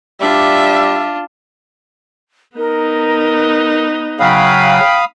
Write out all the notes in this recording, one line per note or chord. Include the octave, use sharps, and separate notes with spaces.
G3 D4 F4 E5
B3 D#4 A#4
C#3 F#3 F5 G5 B5 D#6